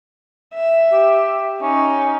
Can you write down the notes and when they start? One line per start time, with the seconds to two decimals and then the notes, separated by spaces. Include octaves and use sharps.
0.54 E5
0.92 G4
1.61 C#4 D#4